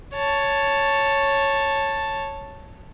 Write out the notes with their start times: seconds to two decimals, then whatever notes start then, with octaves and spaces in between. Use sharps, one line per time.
0.14 C#5 A5